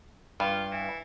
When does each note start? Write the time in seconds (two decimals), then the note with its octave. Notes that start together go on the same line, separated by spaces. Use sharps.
0.40 G2 F4
0.71 E3